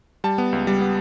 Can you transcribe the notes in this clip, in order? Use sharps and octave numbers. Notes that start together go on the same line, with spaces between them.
G3 A5
B3
C#2
G3
B3